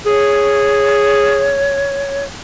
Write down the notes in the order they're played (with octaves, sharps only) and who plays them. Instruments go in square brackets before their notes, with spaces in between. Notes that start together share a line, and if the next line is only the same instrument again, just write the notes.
[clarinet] G#4 [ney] C#5